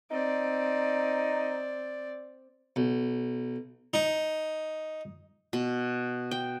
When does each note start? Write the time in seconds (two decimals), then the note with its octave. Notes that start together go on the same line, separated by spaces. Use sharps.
0.11 C4 D#4 D5
2.76 B1
3.94 D#4
5.53 B2
6.31 G5